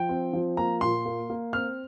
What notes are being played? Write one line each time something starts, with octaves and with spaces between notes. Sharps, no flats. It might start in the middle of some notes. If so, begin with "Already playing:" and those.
Already playing: F3 G5
C4
F3
A#3 A#5
A#2 C6
A#3
A#3
C4 F6